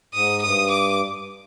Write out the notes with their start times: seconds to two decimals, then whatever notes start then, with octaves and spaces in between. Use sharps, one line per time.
0.14 G#2 D#6
0.42 G2 D#6
0.70 D6